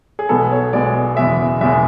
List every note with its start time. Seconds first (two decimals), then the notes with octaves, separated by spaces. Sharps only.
0.19 G#4
0.29 B1 B2 G#3 B3 A4
0.52 C#5
0.73 B1 B2 G#3 B3 D5
1.17 F#1 E2 B2 G#3 E5
1.61 F#1 E2 B2 G#3 E5